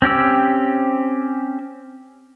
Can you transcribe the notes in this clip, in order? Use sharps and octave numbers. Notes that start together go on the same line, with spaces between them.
C4 C#4 G4 E6